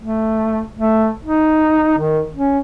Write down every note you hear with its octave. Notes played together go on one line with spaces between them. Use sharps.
A3
A3
D#4
D#3
C#4